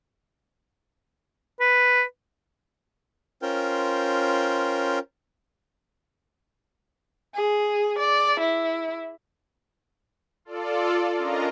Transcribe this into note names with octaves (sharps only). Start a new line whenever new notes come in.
B4
C#4 F4 A#4 C5 G5
G#4
D5
E4
F4 A4 D5
C#4 D4 F4 A#4 D#5 A#5